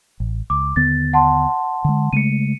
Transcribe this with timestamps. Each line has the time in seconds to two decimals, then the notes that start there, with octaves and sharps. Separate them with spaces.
0.20 A1
0.50 C#2 D6
0.76 D#2 D3 B3 A6
1.13 F#5 A5 C6
1.85 D3 G#3
2.13 C#3 G#3 A3 C#7 D#7